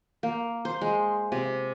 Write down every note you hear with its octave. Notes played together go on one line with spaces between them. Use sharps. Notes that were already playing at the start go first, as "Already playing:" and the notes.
A#3
C5
G#3
C3